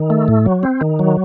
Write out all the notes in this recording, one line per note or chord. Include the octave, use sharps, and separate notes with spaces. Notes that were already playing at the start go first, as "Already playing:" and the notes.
Already playing: D#3
A3
A2
F#3
C4
D#3
F#3